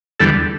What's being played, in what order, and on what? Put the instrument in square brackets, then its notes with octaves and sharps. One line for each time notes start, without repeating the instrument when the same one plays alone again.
[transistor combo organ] E2 D3 G3 A4